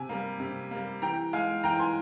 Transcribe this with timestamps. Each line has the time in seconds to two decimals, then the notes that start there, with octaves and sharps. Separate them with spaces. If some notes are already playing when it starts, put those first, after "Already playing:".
Already playing: C3 G#5
0.09 G3 A#3
0.40 C3
0.71 G3 A#3
1.02 E3 G5 A#5
1.33 G#3 F5 G#5
1.64 E3 G5 A#5
1.79 G#5 C6